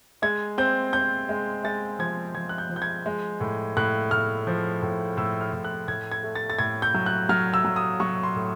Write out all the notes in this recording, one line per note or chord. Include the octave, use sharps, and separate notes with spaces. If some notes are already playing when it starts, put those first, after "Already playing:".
G#3 G#6
C4 G6
C4 G6
G#3
G#3 A6
F3 G#6
F3 G#6
F#6
G6
F3
G6
G#6
G#3
A2
A2 F#6
A2 F6
F3
A2
A2 E6
F6
A2
F#6
A2 G#6
G#6
A3
A6
A6
A2 G#6
G6
F#3
F#6
F#3 F6
E6
F#3
D#6
F#3 C#6
C6
A2